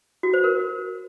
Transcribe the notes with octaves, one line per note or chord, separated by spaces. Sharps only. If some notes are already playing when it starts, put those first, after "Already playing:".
F#4
C5
A#4